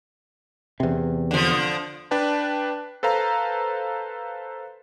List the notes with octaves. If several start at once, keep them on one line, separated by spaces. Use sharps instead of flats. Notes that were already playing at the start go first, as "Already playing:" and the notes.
E2 C3
D3 F3
D4 B4 D5 G5 A5
A4 B4 C5 F5 A#5